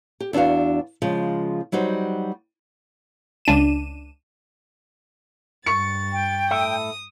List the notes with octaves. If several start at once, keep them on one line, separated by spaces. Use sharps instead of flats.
G4
E2 D4 E4 F#4 F5
C#3 F3 G#3
F#3 G3 D#4 F#4 C5
C#2 D4 D#7 E7
G2 C#6 A6 C#7
G5
A2 A4 E5 D#6